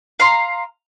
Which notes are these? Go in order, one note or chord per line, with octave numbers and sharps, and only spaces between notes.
F5 A#5 C6